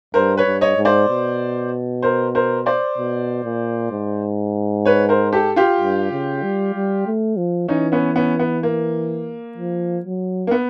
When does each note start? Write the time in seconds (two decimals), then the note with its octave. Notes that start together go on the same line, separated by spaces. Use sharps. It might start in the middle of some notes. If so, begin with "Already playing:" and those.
0.14 G2 A#4 C5
0.37 B4 C#5
0.46 G2
0.61 C#5 D#5
0.77 G#2
0.85 C5 D5
1.09 B2
2.03 A#4 C5
2.35 A#4 C5
2.66 C5 D5
2.98 B2
3.45 A#2
3.92 G#2
4.85 B4 C#5
5.09 A#4 C5
5.33 G4 A4
5.56 F4 G4
5.80 G2
6.12 C#3
6.43 G3
6.75 G3
7.07 A3
7.37 F3
7.68 E3 C#4 D#4
7.92 B3 C#4
8.16 B3 C#4
8.39 B3
8.63 A#3
9.57 F3
10.05 F#3
10.47 A#3
10.51 B3